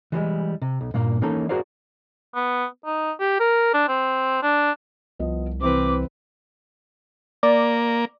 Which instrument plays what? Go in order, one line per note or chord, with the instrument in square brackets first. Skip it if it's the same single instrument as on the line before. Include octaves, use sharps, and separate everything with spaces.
[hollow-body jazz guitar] E3 F3 G3 G#3
C3
B1
G2 A#2 A#3
E3 A#3 C#4 D#4 A4
F#4 G#4 A#4 C5 D5 F5
[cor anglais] B3
D#4
G4
A#4
D4
C4
D4
[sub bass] C2 [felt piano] F3 B3 D#5
[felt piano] C3 E3 [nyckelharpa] C4 B4 [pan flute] D6
[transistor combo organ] A#3 [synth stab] D5